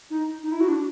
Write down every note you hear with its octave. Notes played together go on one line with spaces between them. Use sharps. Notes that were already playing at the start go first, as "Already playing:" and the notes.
D#4
D#4
E4
F#4
D4